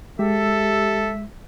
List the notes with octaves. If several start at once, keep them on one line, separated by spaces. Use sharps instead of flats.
G#3 G4 A4 E5